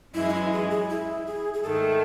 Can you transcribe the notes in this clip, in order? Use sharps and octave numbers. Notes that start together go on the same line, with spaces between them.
F#2 E3 G#3 E4
D#4
E4
G#4
G#4
E4
G#4
G#4
G#2 D#3 A3 A4